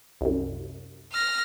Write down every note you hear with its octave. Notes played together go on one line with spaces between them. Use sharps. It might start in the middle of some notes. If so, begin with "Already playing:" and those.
C2 F#2
F6 A#6